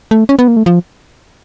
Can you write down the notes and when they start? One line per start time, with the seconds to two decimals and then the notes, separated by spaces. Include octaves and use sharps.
0.11 A3
0.29 C#4
0.39 B3
0.48 A#3
0.57 A3
0.66 F3